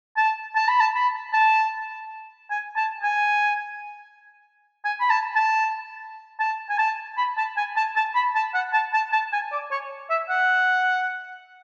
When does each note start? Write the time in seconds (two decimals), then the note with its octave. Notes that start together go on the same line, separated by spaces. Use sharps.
0.17 A5
0.56 A5
0.68 B5
0.80 A5
0.95 B5
1.33 A5
2.50 G#5
2.76 A5
3.03 G#5
4.84 G#5
5.00 B5
5.10 A5
5.36 A5
6.40 A5
6.69 G#5
6.78 A5
7.17 B5
7.37 A5
7.57 G#5
7.76 A5
7.96 A5
8.15 B5
8.35 A5
8.54 F#5
8.73 A5
8.93 A5
9.12 A5
9.32 G#5
9.52 D5
9.71 C#5
10.10 E5
10.29 F#5